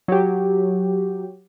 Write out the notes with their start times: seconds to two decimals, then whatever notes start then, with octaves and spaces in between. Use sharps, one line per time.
0.08 F#3 G4